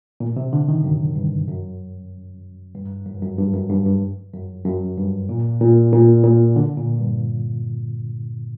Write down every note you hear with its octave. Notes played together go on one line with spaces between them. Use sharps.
A#2
C3
D3
D#3
F#2
G2
F#2
G2
F#2
G2
F#2
G2
F#2
G2
G2
F#2
F#2
G2
A#2
A#2
A#2
A#2
D3
A#2
G2